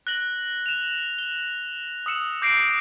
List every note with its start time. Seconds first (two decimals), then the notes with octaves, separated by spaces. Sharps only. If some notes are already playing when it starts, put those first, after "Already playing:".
0.07 F#6 A#6 F#7 G7
0.66 E7 F7
1.18 G7
2.06 D#6 E6 C#7 E7
2.42 D6 G6 A#6 C7 D7